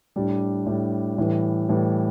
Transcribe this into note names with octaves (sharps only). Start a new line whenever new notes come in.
A2 G3 D4
A2 G3 D4
A2 E3 G3
A2 E3 G3